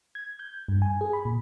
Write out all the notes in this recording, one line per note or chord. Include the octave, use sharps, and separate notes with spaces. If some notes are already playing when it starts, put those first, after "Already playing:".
G#6
G6
G2
G#5
G#4
B5
A#2